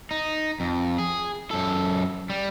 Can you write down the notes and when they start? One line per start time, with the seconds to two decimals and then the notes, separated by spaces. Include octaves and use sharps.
0.11 D#4
0.60 F2
0.99 G#4
1.51 F#2 A4
2.30 G3